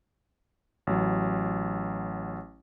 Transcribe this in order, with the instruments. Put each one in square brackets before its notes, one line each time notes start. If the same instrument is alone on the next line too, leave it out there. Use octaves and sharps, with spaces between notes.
[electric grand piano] A1 F#3